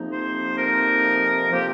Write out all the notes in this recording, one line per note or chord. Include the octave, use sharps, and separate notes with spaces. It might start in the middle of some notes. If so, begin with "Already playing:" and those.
Already playing: F2 C3 F3 A#3 D#4
C5
A#4
C3 F3 A#3 G4